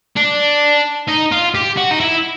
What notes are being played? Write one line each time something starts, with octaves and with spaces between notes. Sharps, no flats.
D4
D#4
F4
G4
F#4
D#4
E4